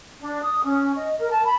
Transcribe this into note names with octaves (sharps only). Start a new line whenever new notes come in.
D4
D#6
C#4
D#5
A#4
A5
B5